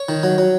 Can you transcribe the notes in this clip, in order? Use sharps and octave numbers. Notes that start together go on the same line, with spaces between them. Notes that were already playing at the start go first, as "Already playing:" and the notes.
Already playing: C#5
D#3
F#3
F#3